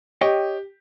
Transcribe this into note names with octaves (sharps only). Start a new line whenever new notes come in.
G4 C#5 D#5 G5